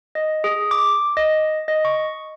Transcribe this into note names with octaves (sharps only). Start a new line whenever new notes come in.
D#5
G#4
D6
D#5
D#5
C#6